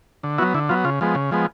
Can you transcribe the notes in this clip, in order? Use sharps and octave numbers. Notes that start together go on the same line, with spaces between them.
D3
F#3 B3 E4 F#4
D3 E4
F#3 B3 F4
C#3 F4
F3 G#3 B3
C#3
F3 G#3 B3